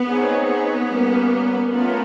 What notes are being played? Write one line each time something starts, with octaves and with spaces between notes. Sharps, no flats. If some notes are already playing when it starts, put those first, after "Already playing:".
Already playing: B3
C4 D#4 G#4 C#5
B3
G3 A#3 C#4
A3 B3 C#4 F4 A#4